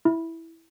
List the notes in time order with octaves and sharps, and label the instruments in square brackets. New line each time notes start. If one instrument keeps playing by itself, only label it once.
[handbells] E4